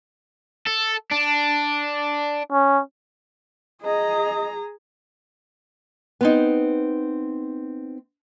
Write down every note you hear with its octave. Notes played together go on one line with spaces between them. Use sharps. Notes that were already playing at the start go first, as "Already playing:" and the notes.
A4
D4
C#4
G#4 D#5 A#5
B3 C4 D#4